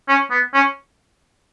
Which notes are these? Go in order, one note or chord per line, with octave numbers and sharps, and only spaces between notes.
C#4
B3
C#4